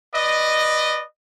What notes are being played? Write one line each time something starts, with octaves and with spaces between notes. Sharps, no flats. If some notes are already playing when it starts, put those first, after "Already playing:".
B4 D5 D#5